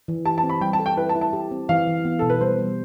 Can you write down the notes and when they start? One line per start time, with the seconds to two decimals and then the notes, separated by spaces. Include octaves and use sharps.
0.08 E3
0.25 G4 A5
0.38 A5
0.43 C4
0.50 B5
0.61 G3 G5
0.73 A5
0.79 A4
0.86 G5
0.97 E4 B4
1.09 A5
1.16 E4
1.21 A5
1.33 G4
1.51 C4
1.69 E3 F5
1.87 E3
2.05 B3
2.19 B2 A4
2.30 B4
2.41 G3 C5
2.59 G3